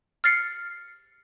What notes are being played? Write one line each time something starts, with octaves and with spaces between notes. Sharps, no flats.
F6 A6 C7 C#7